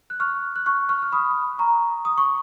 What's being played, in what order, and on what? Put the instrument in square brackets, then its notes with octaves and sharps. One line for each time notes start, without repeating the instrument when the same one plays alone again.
[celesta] F#6
C#6 F6
F#6
C#6 F6
C#6 F6
F6
B5 D#6
A#5 C#6
D#6
C#6